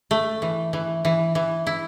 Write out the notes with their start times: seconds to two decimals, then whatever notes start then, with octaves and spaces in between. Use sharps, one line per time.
0.11 A3
0.42 E3
0.73 E3
1.05 E3
1.35 E3
1.67 E4